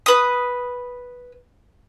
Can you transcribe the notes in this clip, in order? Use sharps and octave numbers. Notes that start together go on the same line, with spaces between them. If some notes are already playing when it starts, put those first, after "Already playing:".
B4 D#6